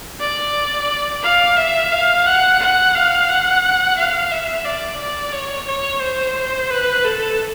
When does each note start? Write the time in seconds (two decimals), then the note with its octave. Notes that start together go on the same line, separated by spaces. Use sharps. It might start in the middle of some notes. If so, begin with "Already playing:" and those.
0.20 D5
1.22 F5
1.57 E5
1.92 F5
2.26 F#5
2.59 F#5
2.95 F5
3.28 F#5
3.97 F5
4.31 E5
4.65 D5
4.99 D5
5.33 C#5
5.67 C#5
6.01 C5
6.70 B4
7.04 A4